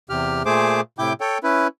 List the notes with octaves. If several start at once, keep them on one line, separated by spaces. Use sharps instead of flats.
E2 C3 G4 F6
A#2 A3 G#4 C5 D6
A2 C3 E4 G5 D6 G6
A4 C#5 G5
C#4 E4 B4